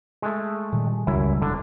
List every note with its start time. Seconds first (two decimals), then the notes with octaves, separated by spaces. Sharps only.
0.22 G#3 A3
0.73 A#2 D#3 G3
1.07 D#1 C#2 F#2 G3 E4
1.42 E1 D3 D4